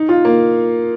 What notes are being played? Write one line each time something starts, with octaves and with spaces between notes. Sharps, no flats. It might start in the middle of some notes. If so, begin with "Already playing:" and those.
Already playing: D#4
F4
A#3